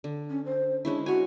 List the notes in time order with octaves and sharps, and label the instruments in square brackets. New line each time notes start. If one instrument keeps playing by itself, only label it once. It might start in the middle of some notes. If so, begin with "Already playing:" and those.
[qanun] D3
[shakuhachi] C#4
C5
[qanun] G#3 C#4 E4 [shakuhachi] D4
[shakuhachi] F#4 [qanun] C#5 G#5